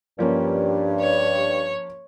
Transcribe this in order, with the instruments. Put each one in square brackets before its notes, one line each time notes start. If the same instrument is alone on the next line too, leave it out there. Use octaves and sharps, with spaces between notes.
[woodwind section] G2 [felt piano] F3 A#3 C#4
[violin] C#5